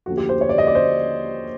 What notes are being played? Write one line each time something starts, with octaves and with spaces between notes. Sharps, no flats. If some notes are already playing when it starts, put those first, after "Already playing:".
D#2 D3 F3 A3 F#4
G4
C5
C#5
D5
D#5
D5
C5